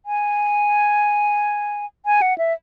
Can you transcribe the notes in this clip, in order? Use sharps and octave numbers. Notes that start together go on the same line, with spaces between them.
G#5
G#5
F#5
E5